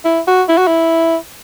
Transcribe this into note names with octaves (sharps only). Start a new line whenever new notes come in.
E4
F#4
E4
F#4
E4